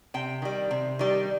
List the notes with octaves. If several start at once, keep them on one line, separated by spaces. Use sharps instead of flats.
C3 G5
D#3 G3
C3
D#3 G3